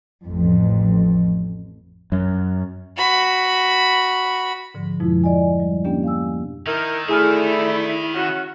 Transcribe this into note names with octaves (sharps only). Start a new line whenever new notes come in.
A1 F2
F#2
F#4 B5
G#2 D3 F3
F2 B2 F3 G#3 E4 F4
D5 D#5 G#5
G3
A#3 B3 C#4 D4 G4 G5
F5 G#5 E6
D#3 D#4 E4 A#4
D3 A3 E4 G#4 G#5 F6
C#4 F#4